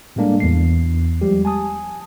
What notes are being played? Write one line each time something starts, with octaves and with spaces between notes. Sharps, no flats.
A2 G3 G#3 A#3 D4 A4
E2 C7
F3 G3 G#3 G4
G#5 A5 D#6